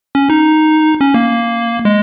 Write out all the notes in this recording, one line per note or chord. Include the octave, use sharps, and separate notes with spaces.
C#4
D#4
C#4
A#3
G#3